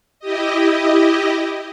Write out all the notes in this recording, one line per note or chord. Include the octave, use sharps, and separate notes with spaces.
E4 G4 D#5